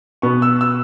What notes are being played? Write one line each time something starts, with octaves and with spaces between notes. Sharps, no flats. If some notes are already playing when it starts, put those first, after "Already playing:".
B2 B3 C#6
E6
E6